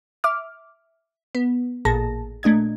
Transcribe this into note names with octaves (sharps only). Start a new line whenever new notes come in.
E5 D6 F6
B3
A1 A#2 A#3 G#4 A5 A#6
A#2 A3 D4 D#5 G#6